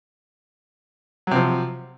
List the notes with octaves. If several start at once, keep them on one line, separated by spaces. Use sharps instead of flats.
C3 F3 F#3